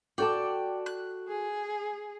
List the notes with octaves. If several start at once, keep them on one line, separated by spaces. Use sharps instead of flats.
F#4 A4 D5 G5 A5
F#6
G#4